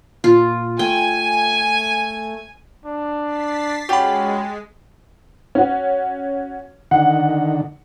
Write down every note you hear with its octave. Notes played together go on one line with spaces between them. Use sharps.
A#2 F4
A3 G5 G#5
D4
A6 B6 C7
G#3 C#4 F#4 G4 B5
C#4 F#4
D3 D#3 F#5